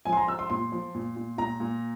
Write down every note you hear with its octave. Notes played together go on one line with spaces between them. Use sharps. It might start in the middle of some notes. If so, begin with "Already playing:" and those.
F3 G#5
C6
A#5
F3 E6
C6
A#2 C6
F3
A#2
A#2
A#2 A#5
A#2